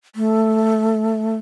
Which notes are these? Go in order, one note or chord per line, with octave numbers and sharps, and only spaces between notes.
A3